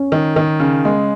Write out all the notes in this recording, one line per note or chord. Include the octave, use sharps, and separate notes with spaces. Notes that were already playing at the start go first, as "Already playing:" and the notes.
Already playing: C#4
D#3
D#3
C#3
G#3